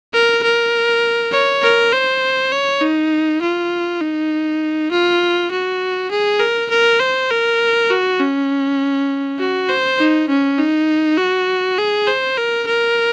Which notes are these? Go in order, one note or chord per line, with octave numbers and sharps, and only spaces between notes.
A#4
A#4
C#5
A#4
C5
C#5
D#4
F4
D#4
F4
F#4
G#4
A#4
A#4
C5
A#4
F#4
C#4
F#4
C5
D#4
C#4
D#4
F#4
G#4
C5
A#4
A#4